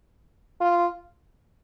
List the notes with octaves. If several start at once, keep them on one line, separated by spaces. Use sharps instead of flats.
F4